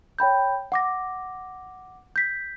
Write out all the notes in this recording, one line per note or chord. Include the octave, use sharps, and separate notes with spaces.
C#5 G5 B5 G6
F#5 D6 A#6
G6 B6